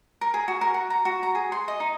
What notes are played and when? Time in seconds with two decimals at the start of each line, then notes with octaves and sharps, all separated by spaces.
0.21 A#4
0.34 G#4
0.48 F#4
0.61 A#4
0.74 F#4
0.90 A#5
1.05 F#4
1.23 A#5
1.35 G#4
1.52 C6
1.68 D#5
1.80 D#4